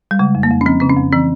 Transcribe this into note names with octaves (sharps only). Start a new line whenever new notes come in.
G3
C#3 G#3
F2
A#3
F2
C#4
F3 C4
C#3 C4
C#4
F2
E3 C4